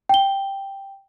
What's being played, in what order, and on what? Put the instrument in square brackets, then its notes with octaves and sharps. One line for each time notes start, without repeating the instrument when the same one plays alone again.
[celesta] G5 G7